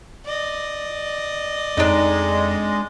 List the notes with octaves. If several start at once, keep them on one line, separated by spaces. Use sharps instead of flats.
D5 D#5
F2 G#3 D4 D#4